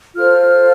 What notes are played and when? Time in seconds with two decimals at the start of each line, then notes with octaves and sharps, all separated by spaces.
0.16 F4 A4 C5 F6